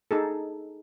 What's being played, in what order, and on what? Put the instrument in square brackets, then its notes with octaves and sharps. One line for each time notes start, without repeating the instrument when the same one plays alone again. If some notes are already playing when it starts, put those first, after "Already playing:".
[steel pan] D#4 G#4 A4